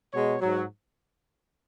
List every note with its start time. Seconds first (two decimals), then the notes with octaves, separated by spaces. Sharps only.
0.12 B2 G#3 C#5
0.40 G#2 F#3